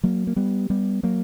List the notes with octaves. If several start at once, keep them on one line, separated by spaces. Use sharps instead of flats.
F#3 A#3
A#3
G3 B3
G3 B3
F#3 A#3